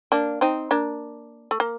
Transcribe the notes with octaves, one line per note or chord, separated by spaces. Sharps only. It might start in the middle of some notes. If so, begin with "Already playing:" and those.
A#3 D4
C4 D#4
A#3 D4
A3
A#3